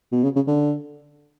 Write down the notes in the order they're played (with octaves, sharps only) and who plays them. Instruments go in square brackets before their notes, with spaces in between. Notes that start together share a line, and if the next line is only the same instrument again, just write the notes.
[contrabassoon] B2
C#3
C#3
D3